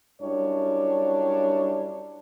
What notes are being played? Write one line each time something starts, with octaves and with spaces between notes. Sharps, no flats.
F#2 G3 D4 E4 C#5